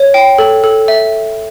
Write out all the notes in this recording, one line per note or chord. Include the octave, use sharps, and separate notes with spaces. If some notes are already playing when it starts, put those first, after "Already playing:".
Already playing: C#5
G5
A4
A4
E5